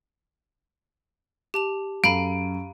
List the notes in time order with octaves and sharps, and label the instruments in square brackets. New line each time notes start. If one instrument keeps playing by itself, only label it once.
[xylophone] G4 A5 F7
[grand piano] F#2 A4 D#7 [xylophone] F5 A#5 B5 [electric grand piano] D7